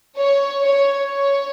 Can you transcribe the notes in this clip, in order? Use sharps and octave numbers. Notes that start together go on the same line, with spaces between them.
C#5
C#5
C#5